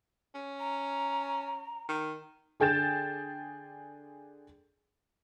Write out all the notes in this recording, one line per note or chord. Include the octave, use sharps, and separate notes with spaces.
C#4
A#5
D#3
D3 G#4 G5 G6 A6 E7